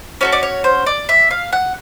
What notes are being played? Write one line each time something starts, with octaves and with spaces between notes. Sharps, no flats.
C#4 F#4 A4 C#5
D5
C#5
C5
D5
E5
F5
F#5